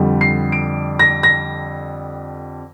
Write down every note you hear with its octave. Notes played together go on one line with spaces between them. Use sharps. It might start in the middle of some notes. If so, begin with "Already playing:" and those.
Already playing: F2 D3 G3
C7
D7
A#6
A#6